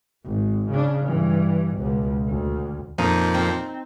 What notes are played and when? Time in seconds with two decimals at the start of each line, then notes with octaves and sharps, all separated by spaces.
0.24 G#1
0.70 C#3 D4
1.06 G2 E3
1.76 C#2 B2
2.28 D2
2.98 F2 A#2 F3 D#4
3.34 C4